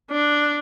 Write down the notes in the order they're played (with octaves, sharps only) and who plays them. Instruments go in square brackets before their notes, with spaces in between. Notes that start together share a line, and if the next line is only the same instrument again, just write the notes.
[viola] D4